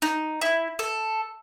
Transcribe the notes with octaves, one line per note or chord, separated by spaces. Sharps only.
D#4
E4
A4